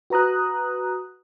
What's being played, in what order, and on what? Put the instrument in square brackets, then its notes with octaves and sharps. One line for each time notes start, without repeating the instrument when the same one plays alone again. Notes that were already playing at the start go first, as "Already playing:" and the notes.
[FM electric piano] F#4 B4 A#5 D#6 F#6